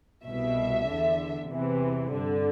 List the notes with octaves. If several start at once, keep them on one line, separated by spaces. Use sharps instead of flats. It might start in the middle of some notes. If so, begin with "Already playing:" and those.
C2 B2 E5
E2 D3
E2 C3 E3
G2 D3